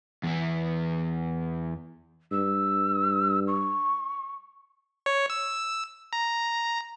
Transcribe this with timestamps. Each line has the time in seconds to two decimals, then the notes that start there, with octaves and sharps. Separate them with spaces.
0.23 E2 E3
2.32 G2 E6
3.47 C#6
5.06 C#5
5.30 E6
6.13 A#5